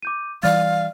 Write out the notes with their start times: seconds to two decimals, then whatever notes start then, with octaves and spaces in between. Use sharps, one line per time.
0.03 D6 G6 D#7
0.43 E3 G3 D5 F5 F6 A6